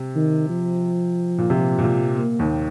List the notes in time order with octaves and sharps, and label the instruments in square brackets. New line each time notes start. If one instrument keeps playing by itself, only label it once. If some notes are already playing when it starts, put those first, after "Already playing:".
Already playing: [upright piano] C3
[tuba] D#3
F3
[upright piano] A#2
C3
A#2
C3
[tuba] A#3
[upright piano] D#2 D#3